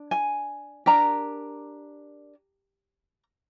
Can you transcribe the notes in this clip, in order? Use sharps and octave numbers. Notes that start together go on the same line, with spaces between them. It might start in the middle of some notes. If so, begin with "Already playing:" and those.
Already playing: D4
G#5
D4 G4 A#4 A#5